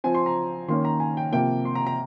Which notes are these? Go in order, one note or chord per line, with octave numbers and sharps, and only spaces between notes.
F3 C4 G#5
C6
A#5
D#3 A#3 C#4 C6
A#5
G#5
G5
C3 F3 A#3 G5
C6
A#5
A#5